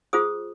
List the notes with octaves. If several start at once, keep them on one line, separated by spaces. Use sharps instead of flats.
F4 G#4 C5 D#6